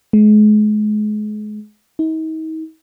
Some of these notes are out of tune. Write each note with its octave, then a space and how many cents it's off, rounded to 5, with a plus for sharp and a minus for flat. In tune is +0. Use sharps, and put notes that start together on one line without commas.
G#3 +35
D#4 +40